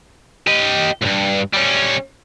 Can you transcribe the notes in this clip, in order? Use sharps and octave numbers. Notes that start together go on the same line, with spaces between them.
G4 D#5
C#2 G2
G3 C#4